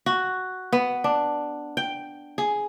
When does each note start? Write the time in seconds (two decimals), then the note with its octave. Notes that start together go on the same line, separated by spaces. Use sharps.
0.06 F#4
0.72 B3
1.04 D4
1.77 G5
2.38 G#4